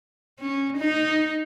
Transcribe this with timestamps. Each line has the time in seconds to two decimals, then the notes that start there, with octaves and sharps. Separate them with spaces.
0.40 C#4
0.78 D#4